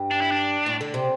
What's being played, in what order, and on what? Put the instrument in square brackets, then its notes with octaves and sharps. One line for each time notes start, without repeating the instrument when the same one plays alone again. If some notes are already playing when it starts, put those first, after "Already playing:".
Already playing: [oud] G2
[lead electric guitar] D4
E4
D4
[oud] A2
D3
C3